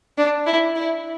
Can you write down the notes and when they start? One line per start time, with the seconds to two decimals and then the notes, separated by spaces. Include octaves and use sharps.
0.18 D4
0.47 E4
0.75 E4